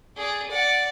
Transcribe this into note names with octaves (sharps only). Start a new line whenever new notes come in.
G#4 D5
D5 F#5